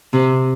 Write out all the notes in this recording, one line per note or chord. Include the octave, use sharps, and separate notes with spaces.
C3